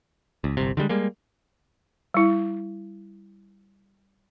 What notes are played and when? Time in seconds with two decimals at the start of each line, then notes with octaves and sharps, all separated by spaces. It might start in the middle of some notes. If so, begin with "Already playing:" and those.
0.44 C#2
0.57 G1 C2 C3
0.77 D3 D#3 G3 G#3
0.89 G3 G#3 A#3
2.14 G3 E4